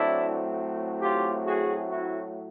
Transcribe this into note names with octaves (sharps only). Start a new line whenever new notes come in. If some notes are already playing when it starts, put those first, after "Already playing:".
Already playing: A2 F#3 A3 C4 D4 E4
F4 G4
F#4 G#4
E4 F#4